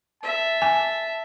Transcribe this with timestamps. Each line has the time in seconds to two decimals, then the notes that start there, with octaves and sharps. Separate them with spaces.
0.23 E5 A5
0.62 G#5